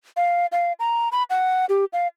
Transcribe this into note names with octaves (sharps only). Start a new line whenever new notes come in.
F5
F5
A#5
B5
F#5
G4
F5